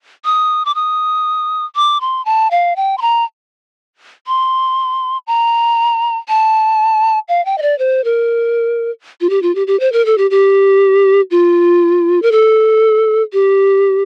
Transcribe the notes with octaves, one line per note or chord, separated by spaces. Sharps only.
D#6
D6
D#6
D6
C6
A5
F5
G5
C6
A#5
C6
A#5
A5
F5
G5
D#5
D5
C5
A#4
F4
G4
F4
G4
G4
C5
A#4
A4
G4
G4
F4
A#4
A4
G4